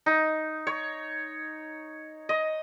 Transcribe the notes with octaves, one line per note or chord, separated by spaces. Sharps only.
D#4
C#5
D#5